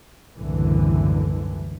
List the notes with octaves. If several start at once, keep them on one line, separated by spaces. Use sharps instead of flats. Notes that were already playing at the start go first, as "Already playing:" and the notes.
F#1 C2 A2 D3 E3